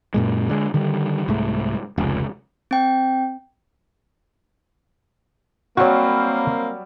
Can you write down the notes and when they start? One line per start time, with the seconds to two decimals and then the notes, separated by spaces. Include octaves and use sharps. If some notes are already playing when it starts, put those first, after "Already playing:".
0.14 F#2 A#2 G#3
0.49 D3 G#3
0.74 D3 D#3 G3
1.28 C2 G#2 A3
1.98 F1 C#2
2.71 C4 G5
5.77 F#3 G3 A#3 C4 F#4 C#5